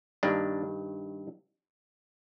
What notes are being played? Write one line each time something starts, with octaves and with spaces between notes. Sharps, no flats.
G2 D#3 A#3 D4